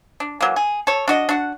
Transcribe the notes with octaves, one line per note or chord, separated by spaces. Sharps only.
D4
E3 F#3 A#3
G#4
A4 C#5
D4 F#4 D#5
D4 F#4 F#5